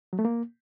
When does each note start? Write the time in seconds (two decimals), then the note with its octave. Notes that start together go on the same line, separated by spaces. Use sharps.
0.13 F#3
0.19 A3
0.25 A#3